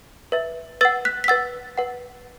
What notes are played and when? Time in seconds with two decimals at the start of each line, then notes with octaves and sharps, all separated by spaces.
0.32 B4 E5
0.81 B4 F#5 E6 A6
1.05 F#6 B6
1.24 B6
1.28 B4 F#5 E6 A6
1.78 B4 F#5